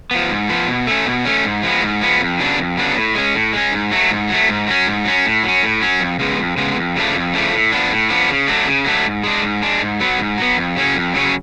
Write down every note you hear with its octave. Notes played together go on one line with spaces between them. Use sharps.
F3 B3
G#2
F3 B3
B2
A3 C#4
B2
A3 C#4
G#2
F3 G#3 B3
G#2
F3 G#3 B3
F2
C#3 F#3 B3 D4
F2
C#3 F#3 B3 D4
A2
G#3 C#4
A2
G#3 C#4
G#2
F#3 A3
G#2
F#3 A3
G#2
F#3 C#4
G#2
F#3 C#4
A2
F#3 C#4
A2
F#3 C#4
F2
C#3 G#3 B3
F2
C#3 G#3 B3
F2
C#3 F3 A3 D4
F2
C#3 F3 A3 D4
A2
F3 B3 D4
A2
F3 B3 D4
C#3
F#3 A3 D4
C#3
F#3 A3 D4
G#2
G#3 D4
G#2
G#3 D4
G#2
F#3 B3
G#2
F#3 B3
F2
C#3 F#3 C#4
F2
C#3 F#3 C#4